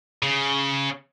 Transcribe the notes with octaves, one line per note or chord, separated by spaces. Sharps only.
C#3